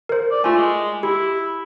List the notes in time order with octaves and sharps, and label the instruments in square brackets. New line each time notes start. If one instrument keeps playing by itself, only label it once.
[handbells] A#4 C5
[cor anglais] D5
[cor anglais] A3 [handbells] F4 G#5
[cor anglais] G#3
[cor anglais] E4 [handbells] G4